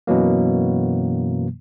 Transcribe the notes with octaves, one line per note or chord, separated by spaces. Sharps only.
F#2 B2 E3 F#3 A#3